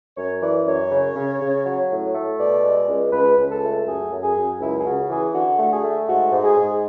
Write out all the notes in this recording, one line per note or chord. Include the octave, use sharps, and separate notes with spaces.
F#2 C#5
E3 D5
F#2 C#5
C#3
C#3
C#3
F#3
A2
A3
B2 D5
G#3
C#2
C#2 B4
C#2
A4
A3
F#2 G#4
F#2
G#4
F#2
C#2 E4
G#4
C#3 F#4
E3 G#4
D3 F#4
A3 F#4
G#4
A3
G#2 F#4
G#2
G#4
G#2